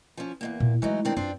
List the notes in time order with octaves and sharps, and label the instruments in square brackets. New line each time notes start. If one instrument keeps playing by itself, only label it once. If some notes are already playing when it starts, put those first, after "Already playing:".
[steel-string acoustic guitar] F3 C#4
E2 G#2 A#3
[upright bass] A#2
[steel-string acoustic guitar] E3 F#3 D#4 [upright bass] G#3 A3
[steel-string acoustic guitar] D#3 C4 D4
[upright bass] F#2 [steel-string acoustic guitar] C4 D4 F4